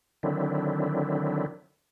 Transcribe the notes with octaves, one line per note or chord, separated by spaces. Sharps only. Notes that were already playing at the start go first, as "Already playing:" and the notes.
D3 D#3 F#3 C4 D4 E4